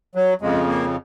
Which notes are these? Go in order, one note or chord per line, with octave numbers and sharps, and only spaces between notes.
F#3
F2 C#3 G#3
A#3